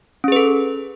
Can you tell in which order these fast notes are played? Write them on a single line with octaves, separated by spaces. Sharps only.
C#4 G#4 B4 A4